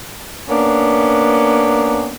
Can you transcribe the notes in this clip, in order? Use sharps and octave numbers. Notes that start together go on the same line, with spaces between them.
A#3 B3 C#4 D4